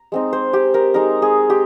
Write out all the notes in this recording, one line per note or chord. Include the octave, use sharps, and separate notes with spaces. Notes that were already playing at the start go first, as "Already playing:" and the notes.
Already playing: A#5
G#3 C4 D#4
C5
G4
A#4
G#3 D#4 A#4
G#4
G4